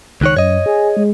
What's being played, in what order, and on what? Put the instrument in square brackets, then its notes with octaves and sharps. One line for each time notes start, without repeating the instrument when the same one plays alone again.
[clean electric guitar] C#2 D#3 C#5 [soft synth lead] F#6
[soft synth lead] F#2 [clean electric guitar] C#5 D#5
[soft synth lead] G#4
G#3